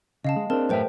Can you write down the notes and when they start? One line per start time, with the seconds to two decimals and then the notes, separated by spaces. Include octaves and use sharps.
0.25 C#3 D#5 F5 A5
0.36 G#3
0.50 C4 D4 G#4 A#4 A5
0.69 F#2 A2 B4 C5 E5 G5